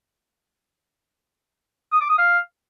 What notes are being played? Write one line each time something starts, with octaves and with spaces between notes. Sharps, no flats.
D#6
D6
D#6
F5